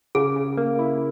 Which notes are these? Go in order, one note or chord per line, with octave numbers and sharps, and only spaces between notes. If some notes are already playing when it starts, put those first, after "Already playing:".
C#3 G#4
C#3
A#3
E4